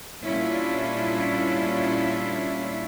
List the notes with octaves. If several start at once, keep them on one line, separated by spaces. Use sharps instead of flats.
A#2 G3 C#4 D4 E4 F4